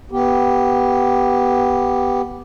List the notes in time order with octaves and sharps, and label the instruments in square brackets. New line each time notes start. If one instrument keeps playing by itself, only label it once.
[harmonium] B3 G4